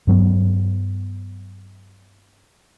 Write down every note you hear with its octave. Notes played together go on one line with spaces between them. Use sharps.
G2 F#3 B3